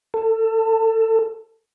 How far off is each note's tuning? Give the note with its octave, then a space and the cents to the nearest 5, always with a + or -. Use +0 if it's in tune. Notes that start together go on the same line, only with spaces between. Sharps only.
A4 +25